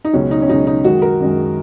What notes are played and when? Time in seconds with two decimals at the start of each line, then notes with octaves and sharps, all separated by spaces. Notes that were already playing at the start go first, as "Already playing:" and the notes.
0.05 D#4
0.13 C#2 B2 F#3 C#4
0.31 D#4
0.42 C#4
0.48 C#2 B2 F#3 D#4
0.67 D#4
0.84 F#2 D#3 G#3 F#4
1.02 A#4
1.20 F#2 D#3 G#3